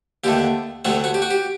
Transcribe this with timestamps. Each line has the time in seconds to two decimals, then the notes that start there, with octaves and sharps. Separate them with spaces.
0.24 D#2 D3 A3 G4
0.85 D2 C3 F#3 A3 F#4
1.04 F#4
1.14 G4
1.22 F#4
1.31 G4